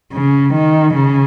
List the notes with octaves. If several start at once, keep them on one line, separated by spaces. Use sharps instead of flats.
C#3
D#3
C#3